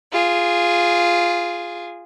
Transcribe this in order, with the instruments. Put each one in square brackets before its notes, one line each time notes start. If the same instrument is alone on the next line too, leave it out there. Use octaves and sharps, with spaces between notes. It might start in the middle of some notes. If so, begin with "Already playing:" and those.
[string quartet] F4 G#4